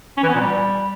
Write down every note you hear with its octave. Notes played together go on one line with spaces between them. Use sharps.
C#4
E3
B3
A#2
G3